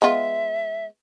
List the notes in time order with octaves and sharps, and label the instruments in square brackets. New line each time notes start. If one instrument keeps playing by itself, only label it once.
[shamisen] G#3 B3 F4 [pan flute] E5